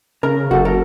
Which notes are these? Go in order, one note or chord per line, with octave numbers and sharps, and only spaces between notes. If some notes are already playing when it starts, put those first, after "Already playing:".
C#3 A#4 A#5
F#1 F#4 A4
A4 A#4